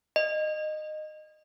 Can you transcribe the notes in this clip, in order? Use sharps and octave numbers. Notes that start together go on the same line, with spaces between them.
D#5